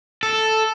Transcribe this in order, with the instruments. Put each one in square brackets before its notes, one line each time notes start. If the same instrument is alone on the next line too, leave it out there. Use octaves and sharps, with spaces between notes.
[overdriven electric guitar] A4